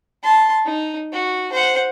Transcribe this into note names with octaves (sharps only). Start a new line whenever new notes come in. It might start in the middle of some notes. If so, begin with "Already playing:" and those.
A5 C6
D#4
F#4
C5 F#5